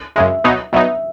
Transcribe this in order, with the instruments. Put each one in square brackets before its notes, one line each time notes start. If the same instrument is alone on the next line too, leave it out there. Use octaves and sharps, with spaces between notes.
[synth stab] F#2 C#3 G#3 [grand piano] E5
[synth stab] B2 F#3 B3 D#4
[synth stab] B2 F#3 B3 D#4 [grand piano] E5